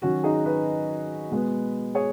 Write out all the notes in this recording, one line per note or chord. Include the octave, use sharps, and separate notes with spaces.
D#3 F#3 C#4 F#4
D#4 G#4
B4 D#5
B2 G#3 B3
G#4 C#5